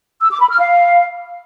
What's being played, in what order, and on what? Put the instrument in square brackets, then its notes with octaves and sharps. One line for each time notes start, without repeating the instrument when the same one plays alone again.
[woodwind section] E6
D6
B5
F6
F5